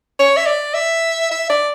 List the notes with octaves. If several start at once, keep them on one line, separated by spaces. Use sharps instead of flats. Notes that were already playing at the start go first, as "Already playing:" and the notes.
C#5
E5
D5
E5
E5
D5